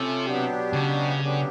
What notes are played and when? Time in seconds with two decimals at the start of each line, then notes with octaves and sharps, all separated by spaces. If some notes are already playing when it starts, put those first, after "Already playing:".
Already playing: C3 A3 C#4 F4 A4
0.25 B2 F#3 B3 D4 G4
0.73 C#3
1.21 D3 F#3 B3 D4 G4